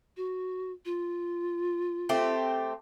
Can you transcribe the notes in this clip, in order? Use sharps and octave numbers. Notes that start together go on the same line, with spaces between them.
F#4
F4
A3 C4 G4